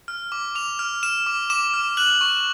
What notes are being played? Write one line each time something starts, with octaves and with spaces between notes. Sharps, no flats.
F6
D6
D6 F7
F6
F6 E7
D6
D6 E7
F6
F#6 F#7
C#6